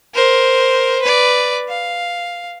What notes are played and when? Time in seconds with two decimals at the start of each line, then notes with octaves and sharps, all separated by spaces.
0.15 A#4 C5
1.02 B4 D5
1.69 F5